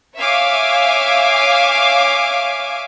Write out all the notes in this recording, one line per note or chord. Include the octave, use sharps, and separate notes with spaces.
C#5 E5 F5 G#5 D6